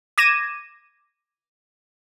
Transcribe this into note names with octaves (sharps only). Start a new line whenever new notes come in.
D6 G#6 A#6 D#7 E7